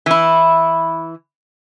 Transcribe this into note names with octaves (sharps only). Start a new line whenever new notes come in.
E3 E4